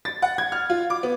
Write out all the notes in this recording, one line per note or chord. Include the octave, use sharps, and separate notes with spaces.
A6
F#5
G#6
F6
F4
D6
B3